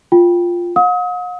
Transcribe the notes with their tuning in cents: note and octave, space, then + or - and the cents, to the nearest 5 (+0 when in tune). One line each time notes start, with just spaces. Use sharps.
F4 +0 G5 +0
F#5 -45 D#6 +40